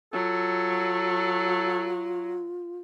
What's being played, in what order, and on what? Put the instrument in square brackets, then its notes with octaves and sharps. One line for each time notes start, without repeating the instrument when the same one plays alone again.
[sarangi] F#3 [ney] F4 [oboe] A4